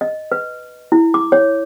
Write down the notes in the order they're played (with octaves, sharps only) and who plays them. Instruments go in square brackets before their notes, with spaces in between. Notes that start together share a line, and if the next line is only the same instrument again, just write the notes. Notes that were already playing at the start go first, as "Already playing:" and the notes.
[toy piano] D#5
B4
E4
D6
C#5